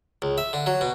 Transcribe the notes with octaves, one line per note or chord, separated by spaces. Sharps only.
C#2
E5
D3
F#3
B2